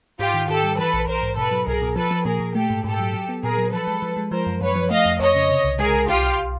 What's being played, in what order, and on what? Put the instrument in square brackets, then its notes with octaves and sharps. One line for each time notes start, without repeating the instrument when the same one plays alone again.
[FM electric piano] G#2 [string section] F4 G4
[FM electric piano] D#3
[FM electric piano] D#3 [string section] G4 A4
[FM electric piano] G3
[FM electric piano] E3 [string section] A4 B4
[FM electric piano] A#1
[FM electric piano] A#1 [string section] A#4 C5
[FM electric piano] G#2
[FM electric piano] B2 [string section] A4 B4
[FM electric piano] F#3
[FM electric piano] C2 [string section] G#4 A#4
[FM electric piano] B2
[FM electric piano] F3 [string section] A4 B4
[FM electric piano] F3
[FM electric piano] A#2 [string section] G#4 A#4
[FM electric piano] A#2
[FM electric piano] A3 [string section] G4 A4
[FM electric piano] G#2
[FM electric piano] G#2 [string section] G4 A4
[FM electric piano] F#3
F#3
B3
[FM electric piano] A#2 [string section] G#4 A#4
[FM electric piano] F#3
[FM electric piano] F3 [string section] A4 B4
[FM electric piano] G#3
F3
G#3
[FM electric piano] F3 [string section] A#4 C5
[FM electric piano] F#2
[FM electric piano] F#2 [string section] B4 C#5
[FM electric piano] F3
[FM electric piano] A3 [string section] D#5 F5
[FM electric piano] F2
[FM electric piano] F2 [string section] C#5 D#5
[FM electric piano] C#3
C3
C2
[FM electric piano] G#3 [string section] G#4 A#4
[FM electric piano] C2
[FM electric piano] B1 [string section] F4 G4
[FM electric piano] B1